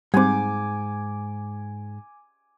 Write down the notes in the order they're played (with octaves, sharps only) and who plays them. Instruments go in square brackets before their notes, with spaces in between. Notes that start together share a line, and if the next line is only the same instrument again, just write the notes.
[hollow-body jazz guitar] G#2 [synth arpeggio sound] G3 C4 [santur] G#5 D6